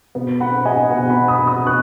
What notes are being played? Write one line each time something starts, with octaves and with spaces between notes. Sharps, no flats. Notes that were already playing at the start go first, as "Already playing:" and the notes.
B2 B3
F#5 B5
D#5 G#5
B2 B3 F#5
F#5 B5
B5 D#6
B5 D#6
B3 C#6 F#6